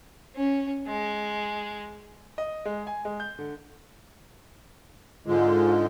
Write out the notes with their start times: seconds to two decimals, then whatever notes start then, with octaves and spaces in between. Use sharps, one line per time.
0.36 C#4
0.87 G#3
2.38 D#5
2.65 G#3
2.87 G#5
3.05 G#3
3.20 G6
3.39 D3
5.27 G#2 D3 G#3 F4